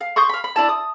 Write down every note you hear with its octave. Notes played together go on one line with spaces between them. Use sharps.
F5
C6 C#6 D#6 G6
F5 B5
B5
D4 E4 A5
D#6